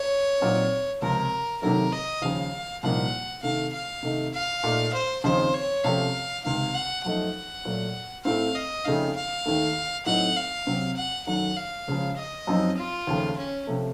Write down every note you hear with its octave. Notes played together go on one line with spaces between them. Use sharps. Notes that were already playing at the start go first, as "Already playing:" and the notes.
Already playing: C#5
A#2 F#3 C4 D#4
C#2 C3 F3 A#4
C3 D#3 F#3 A3 A#4
D#5
D#2 C#3 F3 F5
C2 A#2 F3 A#3 D#4 F#5
C3 D#3 A3 F5
F5
C3 D#3 A3 D#4
F5
A#2 A3 D#4
C5
D#2 C#3 F3 C4 D#4 C5
C#5
C3 F3 A3 C#4 F5
C#2 C3 D#3 F5
F#5
F#2 F3 A3 D#4 F#5
A#2 F#3 A3
A2 A3 C4 F5
D#5
F2 C#3 A3 D#4 F5
F5
D#2 D#3 A3
A2 F#3 C4 D#4 F#5
F5
C3 F#3 C4
F#5
F#2 D#3 A3 F#5
F5
C#2 C#3 F3
D#5
F#2 F3 C4 D#4
F4
D#2 C#3 F3 A3
C#4
C3 F3 A3